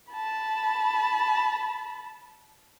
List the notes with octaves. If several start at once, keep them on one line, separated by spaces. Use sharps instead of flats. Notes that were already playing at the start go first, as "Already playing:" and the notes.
A5 B5